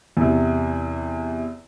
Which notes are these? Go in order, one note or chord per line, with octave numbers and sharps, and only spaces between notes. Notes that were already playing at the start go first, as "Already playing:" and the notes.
E2 C3